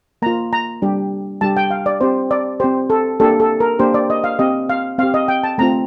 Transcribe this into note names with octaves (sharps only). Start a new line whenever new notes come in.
A#3 F4 A#5
A#5
G3 D4 G4
G3 D4 G4 A5
G5
F5
D5
C4 G4 C5
D5
C4 G4 C5
A4
A#3 D4 G4 A4
A4
A#4
A#3 D4 G4 C5
D5
D#5
F5
C4 G4 D#5
F5
C4 G4 F5
D#5
G5
A5
A3 C4 F4 A#5